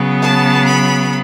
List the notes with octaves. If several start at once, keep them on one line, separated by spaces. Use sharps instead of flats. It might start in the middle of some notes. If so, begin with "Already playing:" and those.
Already playing: C#3 F#3 B3
A5
B5